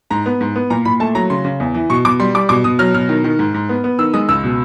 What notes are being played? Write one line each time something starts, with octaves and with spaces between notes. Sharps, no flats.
G#2 A#5
B3
G#2
B3
A#2 A#5
A#2 B5
A3 A5
F#3 A#5
C#3 C6
C#3
E2
E3
B2 C#6
B2 D6
G3 C6
G3 D6
B2 D6
B2 D#6
F#3 F6
B2 F6
D#3
D#3
G#2
G#2
B3
B3
D#3 E6
G#3 D#6
C#2 E6
B2